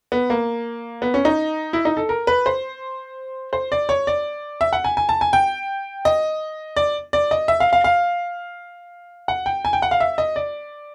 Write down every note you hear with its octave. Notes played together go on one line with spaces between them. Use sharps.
B3
A#3
B3
C#4
D#4
E4
D#4
A4
A#4
B4
C5
C5
D5
C#5
D5
E5
F#5
G#5
G#5
A5
G#5
G5
D#5
D5
D5
D#5
E5
F5
F5
F5
F#5
G5
G#5
G5
F#5
F5
E5
D#5
D5